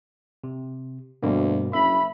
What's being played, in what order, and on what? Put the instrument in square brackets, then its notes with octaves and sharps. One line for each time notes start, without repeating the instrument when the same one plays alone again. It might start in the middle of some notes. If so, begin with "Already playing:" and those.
[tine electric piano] C3
[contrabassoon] D2 [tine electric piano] G2 B2 A#3
[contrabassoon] F#1 [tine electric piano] E5 [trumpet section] B5